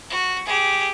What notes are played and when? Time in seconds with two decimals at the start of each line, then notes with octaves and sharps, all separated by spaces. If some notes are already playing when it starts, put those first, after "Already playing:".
0.10 F#4
0.46 G4 G#4